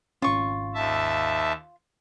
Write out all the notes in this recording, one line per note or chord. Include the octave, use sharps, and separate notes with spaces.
G#1 C#4 F4 C#6
D#2 E5 A5